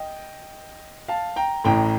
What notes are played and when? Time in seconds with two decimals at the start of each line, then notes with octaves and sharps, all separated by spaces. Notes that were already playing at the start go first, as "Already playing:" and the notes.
Already playing: D#5 G5
1.08 F5 A5
1.36 G5 A#5
1.64 A1 A2 G5 A#5